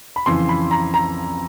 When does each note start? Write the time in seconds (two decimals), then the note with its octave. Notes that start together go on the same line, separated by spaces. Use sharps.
0.16 B5
0.26 F2 C#3 E3 C6
0.49 B5
0.71 A#5
0.94 A#5